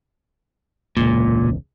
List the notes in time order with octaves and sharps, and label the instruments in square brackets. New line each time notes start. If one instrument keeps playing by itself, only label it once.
[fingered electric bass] E1 C#2 [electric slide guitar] A#2